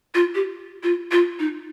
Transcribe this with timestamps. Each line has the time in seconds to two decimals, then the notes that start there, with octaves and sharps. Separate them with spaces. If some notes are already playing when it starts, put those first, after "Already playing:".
0.15 F4
0.35 G4
0.83 F4
1.12 F4
1.39 D#4